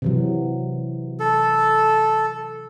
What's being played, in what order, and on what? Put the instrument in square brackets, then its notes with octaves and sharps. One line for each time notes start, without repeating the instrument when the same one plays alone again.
[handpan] C3 E3 F#3
[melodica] A4